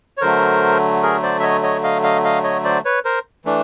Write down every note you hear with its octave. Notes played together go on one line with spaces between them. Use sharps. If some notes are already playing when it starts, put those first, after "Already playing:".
C#5
D3 F#3 A3 A#4 C5
G#4 A#4
C5 D5
E5
C#5 D#5
C#5 D#5
D#5 F5
D#5 F5
D#5 F5
C#5 D#5
C5 D5
B4 C#5
A#4 C5
E3 A3 D4